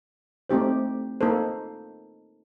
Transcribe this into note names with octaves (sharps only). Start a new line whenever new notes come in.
A3 C4 D#4 G4 C5
A#3 D#4 A4 C5